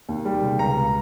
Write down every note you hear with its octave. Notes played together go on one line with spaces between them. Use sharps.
D#2
G3
C#3
C#2 A#5
C#2